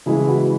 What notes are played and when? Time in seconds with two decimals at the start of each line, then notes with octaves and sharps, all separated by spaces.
0.06 C#3 E3 G#3 E4 G#4
0.28 F#4 B4